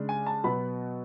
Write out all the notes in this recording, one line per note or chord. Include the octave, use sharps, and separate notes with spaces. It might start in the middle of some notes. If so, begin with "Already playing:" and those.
Already playing: C#3 G#3 D4
G#5
A5
B2 F#3 B3 B5